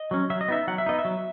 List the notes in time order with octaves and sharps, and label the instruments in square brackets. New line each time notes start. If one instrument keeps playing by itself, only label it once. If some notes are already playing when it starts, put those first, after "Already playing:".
Already playing: [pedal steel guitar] D#5
F#3 C#4
F#3 E5
D#5
B3 D#4 E5
F#3 F#5
E5
B3 D#4 D#5
E5
F#3